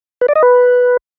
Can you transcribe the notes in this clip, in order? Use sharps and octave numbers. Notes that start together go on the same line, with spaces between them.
B4
D5
D#5
B4